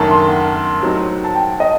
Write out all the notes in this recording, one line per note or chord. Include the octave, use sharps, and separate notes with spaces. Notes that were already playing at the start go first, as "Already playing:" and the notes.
Already playing: F#1 F#2 D#3 A3 D4 A#4 A5
C6
F#5
A2 F#3 C4 D#4
A5
G5
D#5